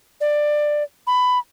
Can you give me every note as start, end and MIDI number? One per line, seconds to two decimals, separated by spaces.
0.21 0.83 74
1.07 1.39 83